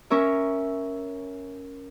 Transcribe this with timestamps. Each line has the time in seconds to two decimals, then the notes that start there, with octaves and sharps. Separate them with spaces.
0.10 C#4 A#4 C#5 E5